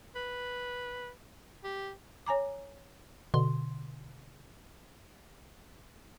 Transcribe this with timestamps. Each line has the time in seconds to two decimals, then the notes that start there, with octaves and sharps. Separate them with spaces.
0.16 B4
1.64 G4
2.26 C#5 G#5 A#5 D6
3.34 B2 D3 C6